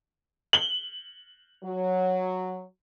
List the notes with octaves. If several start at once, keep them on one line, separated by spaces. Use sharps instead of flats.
F#7 G7
F#3